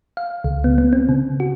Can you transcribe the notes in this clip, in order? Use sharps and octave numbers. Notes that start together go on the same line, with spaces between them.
F5
C#2
B3
B3
C4
C#3
F#4